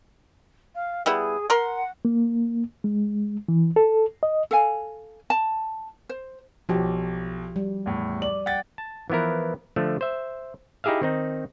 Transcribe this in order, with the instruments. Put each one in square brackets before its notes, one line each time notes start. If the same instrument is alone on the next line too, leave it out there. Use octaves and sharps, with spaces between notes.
[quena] F5
[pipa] G3 B3 E4 [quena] G#4
[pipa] A#4 C6 [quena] F#5
[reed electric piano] A#3
G#3
E3
A4
D#5
[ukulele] A4 F5 G#5
A5
C5
[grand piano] B1 [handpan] F3 F#4 G4
[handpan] G3
[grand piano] E2 A2
[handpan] D5 [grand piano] F#7
[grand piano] F#5 G5 A6
[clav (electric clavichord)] A5
E3 F3 B3 E4 A#4
D3 F3 A3
C5 E5
D#4 E4 G4 G#4 E5 F5
D#3 C4 D#4